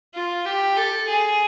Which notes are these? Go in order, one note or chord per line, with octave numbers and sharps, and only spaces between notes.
F4
G4
A4
G#4